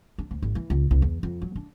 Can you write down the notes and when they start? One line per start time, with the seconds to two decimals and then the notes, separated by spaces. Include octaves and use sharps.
0.18 D4
0.31 D2
0.42 G#1
0.55 E3
0.70 C#2
0.91 C2
1.02 E2
1.23 F2
1.42 F#3
1.56 D4